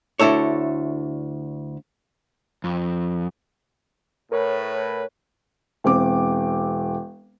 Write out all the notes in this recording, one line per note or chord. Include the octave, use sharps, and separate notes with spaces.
D2 D4 E4 A4 C#5
F2
A2 A#4 B4 C#5
E1 C4 D6